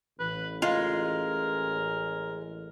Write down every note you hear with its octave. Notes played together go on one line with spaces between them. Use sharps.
A1 B4
G#3 F4 A#4